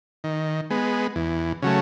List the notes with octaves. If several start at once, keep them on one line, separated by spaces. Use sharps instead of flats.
D#3
G#3 B3
E2
C#3 F#3 A3